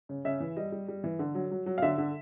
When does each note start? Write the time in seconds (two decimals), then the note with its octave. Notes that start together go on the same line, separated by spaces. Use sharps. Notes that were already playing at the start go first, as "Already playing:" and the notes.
0.09 C#3
0.25 C#3 E5
0.40 E3
0.57 G3 D#5
0.72 G3
0.88 G3
1.04 E3
1.19 D3
1.35 F#3
1.51 F#3
1.66 F#3
1.78 F5
1.82 D3 E5
1.98 D3